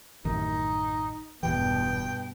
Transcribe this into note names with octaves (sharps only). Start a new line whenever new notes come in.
A1 F#2 D#3 D#4
E1 E2 G2 B2 E3 G5